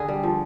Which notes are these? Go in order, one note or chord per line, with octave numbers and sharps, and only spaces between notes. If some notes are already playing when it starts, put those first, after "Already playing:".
Already playing: D3 G#4
G3
F3